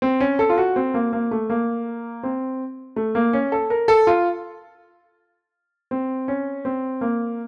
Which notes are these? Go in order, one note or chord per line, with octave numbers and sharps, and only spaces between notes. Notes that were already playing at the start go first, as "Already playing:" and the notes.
C4
C#4
A4
F4
F#4
C4
A#3
A#3
A3
A#3
C4
A3
A#3
C#4
A4
A#4
A4
F4
C4
C#4
C4
A#3